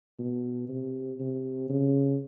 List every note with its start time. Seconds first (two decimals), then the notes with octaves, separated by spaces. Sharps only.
0.19 B2
0.69 C3
1.20 C3
1.70 C#3